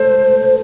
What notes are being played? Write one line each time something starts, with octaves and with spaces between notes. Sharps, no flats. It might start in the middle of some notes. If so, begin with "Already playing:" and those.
Already playing: A4 C5